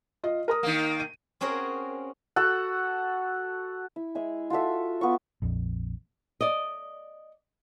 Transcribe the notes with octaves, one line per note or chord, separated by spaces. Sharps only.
F4 D#5
A#4 A#5 D#6
D#3 A#3
D#7
C4 C#4 F#4 G#4 A#4
F#4 A4 F#5
E4
G#3 G#4 E5
F4 F#4 A4 E5
B3 F4 C#6
A#1 F2
D5 D#5